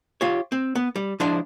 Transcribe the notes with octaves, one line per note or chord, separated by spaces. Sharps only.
F4 G4 C#5
C4
B3
G3
F3 G#3 D4 E4 C5